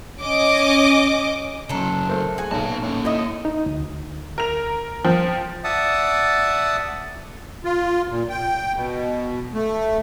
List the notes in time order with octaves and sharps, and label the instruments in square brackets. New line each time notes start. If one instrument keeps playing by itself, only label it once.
[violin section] C#4 D#5 D6
[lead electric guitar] C#3 F#3 [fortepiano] C#4 A#5 [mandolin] D4 A4
[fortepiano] A3 A#4 C5
[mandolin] F#4 G#5 [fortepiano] G#4
[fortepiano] B1 A#2 [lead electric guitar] B3 A5
[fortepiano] A2 C#4 [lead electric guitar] A#3 C#5
[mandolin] D#4 A4 [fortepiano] E4 D#5 D#6
[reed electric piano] D#4
D2
[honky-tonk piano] A#4 F7
[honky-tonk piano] F3 [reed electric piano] C5 G5
[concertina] D5 E5 F#5 A5 D#6
[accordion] F4
A#2
G5
B2
A3